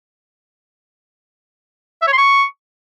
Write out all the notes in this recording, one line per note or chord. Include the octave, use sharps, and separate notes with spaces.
E5
C#5
C6
C#6